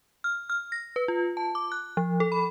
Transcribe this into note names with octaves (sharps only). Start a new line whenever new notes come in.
F6
F6
A#6
B4
F4
A5
D6
F#6
F3
A4
B5